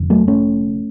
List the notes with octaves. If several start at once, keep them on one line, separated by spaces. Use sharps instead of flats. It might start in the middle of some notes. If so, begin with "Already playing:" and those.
Already playing: F1 F2 D3
F#3 A3
A3 C#4